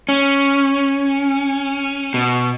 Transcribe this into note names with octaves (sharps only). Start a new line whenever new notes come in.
C#4
B2